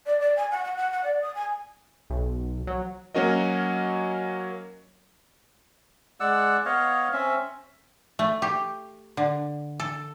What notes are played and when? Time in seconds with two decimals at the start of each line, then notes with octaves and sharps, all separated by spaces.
0.06 D5
0.20 D5
0.36 G#5
0.51 F#5
0.65 F#5
0.77 F#5
0.91 F#5
1.04 D5
1.22 D#6
1.35 G#5
2.10 B1
2.67 F#3
3.15 F#3 A#3 C#4 F#4 A#4 D#5
6.20 G#3 D5 F#5 E6
6.65 B3 C#5 D#5 F5
7.13 C4 C#4 E5
8.19 A3
8.42 G4
9.17 D3
9.80 A4